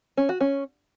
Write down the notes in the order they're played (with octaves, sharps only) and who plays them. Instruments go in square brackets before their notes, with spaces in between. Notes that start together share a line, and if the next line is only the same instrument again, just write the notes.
[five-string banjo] C#4
F#4
C#4